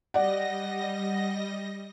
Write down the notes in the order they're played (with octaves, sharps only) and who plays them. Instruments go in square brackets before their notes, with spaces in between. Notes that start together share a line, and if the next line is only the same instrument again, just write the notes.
[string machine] G3 D#5 A#6 [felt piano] D5 F#5